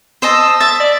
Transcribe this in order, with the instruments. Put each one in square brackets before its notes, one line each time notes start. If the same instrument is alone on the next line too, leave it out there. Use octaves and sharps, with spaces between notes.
[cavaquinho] C5 D#5 A5 [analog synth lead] E6
[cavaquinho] E5 [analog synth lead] A6
[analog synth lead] D5